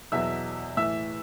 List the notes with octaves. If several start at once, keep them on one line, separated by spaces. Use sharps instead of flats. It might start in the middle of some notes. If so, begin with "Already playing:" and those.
E2 B2 F#3 E5 E6
A2 E3 E5 E6